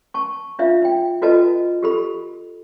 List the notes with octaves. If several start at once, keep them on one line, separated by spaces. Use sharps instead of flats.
A5 C#6
D4 F4 E5 F5
D#4 G5
F4 F#4 A4 B4 D#5 A5
G4 A4 B5